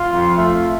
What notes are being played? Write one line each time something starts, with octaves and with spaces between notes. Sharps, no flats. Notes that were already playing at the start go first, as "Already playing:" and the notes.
Already playing: F4
F2
A3